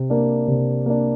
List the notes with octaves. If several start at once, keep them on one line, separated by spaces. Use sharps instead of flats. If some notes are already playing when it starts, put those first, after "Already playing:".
Already playing: C3
A#3 D4
C3
A#3 D4